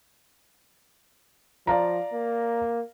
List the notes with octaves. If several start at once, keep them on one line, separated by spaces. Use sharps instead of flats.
F3 D5 F5 A#5
A#3